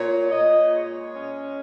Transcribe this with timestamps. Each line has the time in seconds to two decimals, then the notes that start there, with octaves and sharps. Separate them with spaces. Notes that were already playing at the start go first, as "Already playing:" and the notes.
Already playing: A#2 C#5
0.30 A#2 D#5
0.72 G#3 C#5
1.13 C#4